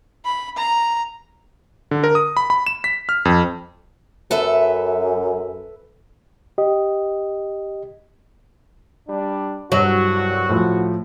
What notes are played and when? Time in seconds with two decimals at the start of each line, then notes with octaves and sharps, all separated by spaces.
0.25 B5
0.57 A#5
1.91 D3
2.04 A#4
2.15 D#6
2.37 B5
2.50 B5
2.66 E7
2.84 B6
3.09 F6
3.25 F2
4.31 F#2 A4 B4 E5
6.58 G4 D#5
9.08 G3 D4
9.72 C2 G2 F#3 F#4
10.49 A2 F3